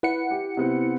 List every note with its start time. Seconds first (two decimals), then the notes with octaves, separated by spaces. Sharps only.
0.03 E4 B4 F#5 C#7
0.31 G4
0.57 C3 B3 C4